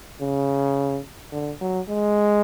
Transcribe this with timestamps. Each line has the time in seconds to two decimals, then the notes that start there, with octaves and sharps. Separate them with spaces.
0.20 C#3
1.32 D3
1.61 F#3
1.89 G#3